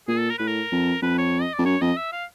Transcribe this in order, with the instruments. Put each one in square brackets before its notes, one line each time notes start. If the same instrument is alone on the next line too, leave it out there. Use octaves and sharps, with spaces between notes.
[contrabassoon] A#2 [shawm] G#4
[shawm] A4
A#4
[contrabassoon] A2 [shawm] B4
[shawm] A#4
[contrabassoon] F2
[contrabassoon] F2 [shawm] B4
[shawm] C#5
D#5
D5
[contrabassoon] F2
[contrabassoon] F#2 [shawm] C#5
[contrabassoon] F2 [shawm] D#5
[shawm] E5
F5